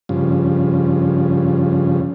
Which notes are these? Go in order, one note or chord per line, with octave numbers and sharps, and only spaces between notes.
G2 C#3 F3